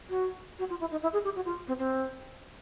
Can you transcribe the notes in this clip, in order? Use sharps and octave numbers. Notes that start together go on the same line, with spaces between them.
F#4
F#4
F4
E4
D#4
E4
G#4
G4
F#4
F4
C4
C4